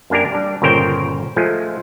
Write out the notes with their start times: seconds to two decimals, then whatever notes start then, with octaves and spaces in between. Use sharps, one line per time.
0.10 F#2 A#3 D4 G4 A#4
0.32 G3 D4
0.62 G1 A#2 C#3 A#4 C5 G5
1.36 F3 G#3 A3